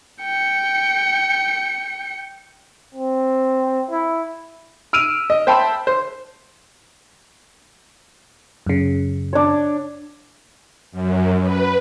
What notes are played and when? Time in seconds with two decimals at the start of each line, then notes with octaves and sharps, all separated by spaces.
0.22 G5 C#7
2.94 C4
3.90 E4
4.93 E6 F6 D7 D#7 F7
5.30 D#5
5.47 C5 E5 G5 A5 B5
5.87 C5
8.66 F#2 C#3
9.33 D4 C#5
10.92 F#2
11.41 B4